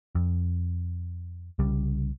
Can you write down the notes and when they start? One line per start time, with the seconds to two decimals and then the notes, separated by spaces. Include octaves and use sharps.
0.15 F2
1.59 C2 C#3 G3